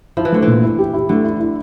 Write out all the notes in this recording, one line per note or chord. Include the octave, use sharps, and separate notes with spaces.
F3 E4
E3
D3 A3
A#2 E3
E4
G4
E4
D3 A3
E4
E4